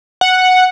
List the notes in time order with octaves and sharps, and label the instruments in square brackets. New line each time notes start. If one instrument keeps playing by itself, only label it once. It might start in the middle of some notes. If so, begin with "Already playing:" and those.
[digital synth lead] F#5